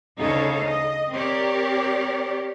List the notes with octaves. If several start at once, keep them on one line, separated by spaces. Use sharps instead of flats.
D2 C#3 D#4 A4 C#5 F5
D#5
C4 G4 A#4 C#5 D5